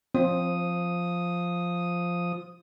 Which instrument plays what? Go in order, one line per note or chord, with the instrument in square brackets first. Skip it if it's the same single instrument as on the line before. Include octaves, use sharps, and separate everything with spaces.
[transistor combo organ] F3 D#6 [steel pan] C4